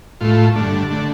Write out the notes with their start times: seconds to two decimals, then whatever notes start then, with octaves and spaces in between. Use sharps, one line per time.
0.20 A2 A3 F4
0.55 G2 D3 A3 D4
0.91 D3 A3